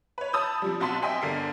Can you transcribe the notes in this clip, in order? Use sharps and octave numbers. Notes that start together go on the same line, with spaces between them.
B4 C#5
A5 B5 D#6 E6 G6
C3 F3 G3
B1 C4 F#4 A5 C6 B6
D#5 E5 G5 G#5 C6 B6
G1 D3 A#4 C7